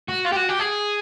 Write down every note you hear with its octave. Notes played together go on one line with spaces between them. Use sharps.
F#4
F4
G4
F#4
G4
G#4